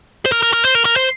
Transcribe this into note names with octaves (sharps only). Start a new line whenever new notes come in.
C5
A#4
A#4
A#4
C5
A#4
A#4
C5